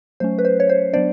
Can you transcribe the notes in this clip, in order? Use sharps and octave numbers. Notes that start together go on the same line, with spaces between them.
F#3 A3 C#4 C5
B4
C5
C#5
C5
F#3 B3 D4 C5 D5